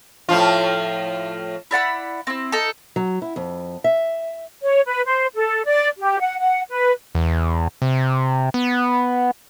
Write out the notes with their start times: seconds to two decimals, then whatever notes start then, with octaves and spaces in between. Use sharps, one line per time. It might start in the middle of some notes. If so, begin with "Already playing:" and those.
0.29 A2 F3 F4
1.71 E4 D5 F#5 B5
2.27 C4 E4
2.52 D#4 A4
2.96 F#3
3.22 E4
3.36 F2
3.84 E5
4.62 C#5
4.85 B4
5.05 C5
5.35 A4
5.65 D5
5.98 G4
6.21 F#5
6.39 F#5
6.70 B4
7.15 E2
7.82 C3
8.54 B3